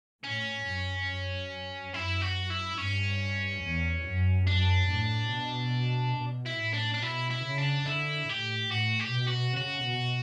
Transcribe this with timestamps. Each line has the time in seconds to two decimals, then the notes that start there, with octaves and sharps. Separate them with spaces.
0.23 A2 C#4
0.66 F#2
1.08 F#2
1.93 F#2 E4
2.21 F#4
2.50 E4
2.78 G2 C#4
3.63 E2
4.06 F#2
4.47 F#2 D4
4.90 A2
5.33 B2
6.17 B2
6.46 E4
6.60 A2
6.73 D4
6.94 D4
7.02 B2 E4
7.30 E4
7.45 C#3
7.58 D4
7.86 D3 E4
8.28 A2 G4
8.71 A2 F#4
9.00 G4
9.14 B2
9.27 F#4
9.56 C#3 F#4
9.84 B2